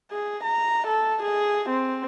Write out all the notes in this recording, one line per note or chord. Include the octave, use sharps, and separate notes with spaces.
G#4
A#5
A4
G#4
C4